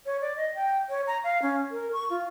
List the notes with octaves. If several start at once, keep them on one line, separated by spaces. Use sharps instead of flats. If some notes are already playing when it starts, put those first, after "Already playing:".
C#5
D5
D#5
G5
C#5
A#5
F5
C#4
A#4
C#6
F4